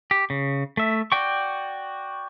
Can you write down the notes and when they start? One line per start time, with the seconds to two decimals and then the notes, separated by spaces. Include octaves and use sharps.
0.11 G4
0.30 C#3
0.77 A3 E5
1.12 F#4 D5 G5 C#6